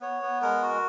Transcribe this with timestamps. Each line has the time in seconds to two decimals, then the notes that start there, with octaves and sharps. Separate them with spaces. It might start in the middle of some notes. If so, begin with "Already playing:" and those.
0.01 B3 C#5
0.22 B3
0.42 G#3 A#4
0.63 F#4